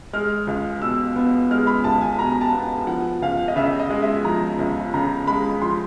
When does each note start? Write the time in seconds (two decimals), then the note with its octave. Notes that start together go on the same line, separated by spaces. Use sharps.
0.13 G#3 F6
0.47 C#2
0.81 B2 E6
1.16 B3
1.51 G#3 F6
1.67 B5
1.84 C#2 A5
2.01 G#5
2.19 B2 A#5
2.41 A5
2.53 B3
2.87 F3 F#5
3.22 C#2 F5
3.48 D#5
3.56 C#3 E5
3.79 D#5
3.90 G#3
4.02 E5
4.25 F3 A#5
4.59 C#2
4.94 C#3 A#5
5.27 G#3 B5
5.62 F3 C6